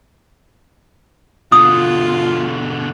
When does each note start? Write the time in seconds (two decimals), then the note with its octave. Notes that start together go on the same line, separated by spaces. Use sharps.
1.52 B2 D3 F4 D#6